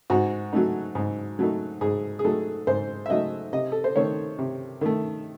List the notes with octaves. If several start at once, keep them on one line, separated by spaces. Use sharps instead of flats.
G#2 F#4
F#3 A3 D#4
G#2
F#3 A3 D#4
G#2 G#4
G#4
F#3 A3 D#4 A4
G#2 C5
E5
F#3 A3 D#4 D#5
C3 D#5
A4
C5
D#3 A3 C#5
C3
D#3 A3